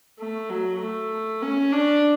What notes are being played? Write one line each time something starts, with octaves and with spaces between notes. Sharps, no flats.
A3
F#3
A3
C#4
D4